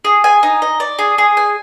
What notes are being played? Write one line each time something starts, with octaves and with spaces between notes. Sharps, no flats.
G#4
G#5
D#4
D#5
D5
G#4
G#4
G#5